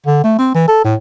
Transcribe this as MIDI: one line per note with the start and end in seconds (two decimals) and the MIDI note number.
0.06 0.19 50
0.24 0.35 57
0.38 0.51 60
0.54 0.66 52
0.68 0.80 69
0.84 0.95 45